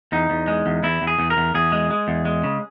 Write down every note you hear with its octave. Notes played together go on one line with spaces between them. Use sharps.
E2 D#4
E2
G#3
E2
E2 E4
E2
G#4
E2
A#4
E2
E2 G#4
G#3
G#3
E2
G#3
C#3